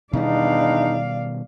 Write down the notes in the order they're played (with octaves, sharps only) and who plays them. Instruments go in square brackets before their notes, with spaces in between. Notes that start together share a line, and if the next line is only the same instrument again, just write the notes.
[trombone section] E2 D4 D#4 [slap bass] B2 D#3 G3 [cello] D5 F5